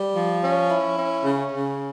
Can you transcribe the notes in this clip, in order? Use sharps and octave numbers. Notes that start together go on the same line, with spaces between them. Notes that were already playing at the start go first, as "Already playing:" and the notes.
Already playing: G3
F3
C#4
E4
C#4
C#3
C#3